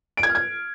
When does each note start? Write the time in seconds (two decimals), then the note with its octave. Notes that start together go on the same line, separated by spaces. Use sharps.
0.17 D7
0.23 G#6
0.29 F6
0.35 G#6